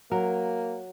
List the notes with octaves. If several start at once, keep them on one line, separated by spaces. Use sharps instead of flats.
F#3 A#3 A#4